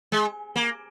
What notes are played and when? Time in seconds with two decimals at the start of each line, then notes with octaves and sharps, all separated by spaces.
0.12 G#3
0.56 A#3